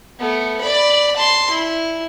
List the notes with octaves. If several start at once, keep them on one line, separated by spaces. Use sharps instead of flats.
A3 B3
D5 B5
A5 C6
E4